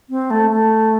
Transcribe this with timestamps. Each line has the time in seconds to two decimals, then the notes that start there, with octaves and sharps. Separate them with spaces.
0.10 C4
0.30 A3
0.50 A3